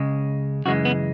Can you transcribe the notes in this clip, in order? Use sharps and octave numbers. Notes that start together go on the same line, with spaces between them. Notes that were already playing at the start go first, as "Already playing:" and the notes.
Already playing: C#2 C#3 G#3
F#2 C#3 E3 G#3 F#4
B3